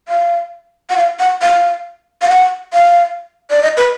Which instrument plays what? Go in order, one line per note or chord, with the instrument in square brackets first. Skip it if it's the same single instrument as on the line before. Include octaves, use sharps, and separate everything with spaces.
[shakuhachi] F5
F#5
F5
F#5
F5
F5
F#5
F5
D5
D#5
B4